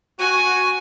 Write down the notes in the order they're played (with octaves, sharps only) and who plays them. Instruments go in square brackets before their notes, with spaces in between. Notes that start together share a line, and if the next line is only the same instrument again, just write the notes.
[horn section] F#4 [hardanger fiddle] G#5